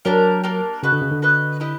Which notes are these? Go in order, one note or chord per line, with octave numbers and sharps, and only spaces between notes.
F#3 A#3 D4 G4 A#4
A#3 D4 G4 A#4
C#3 F#4 B4 D#5
D3
C#3
D3
F#4 B4 D#5
E4 G4 B4 D#5